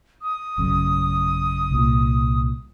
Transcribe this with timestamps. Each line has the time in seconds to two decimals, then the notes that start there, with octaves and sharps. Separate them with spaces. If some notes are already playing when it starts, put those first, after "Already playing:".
0.22 D#6
0.58 A1 F#2 C#3
1.71 C2 A#2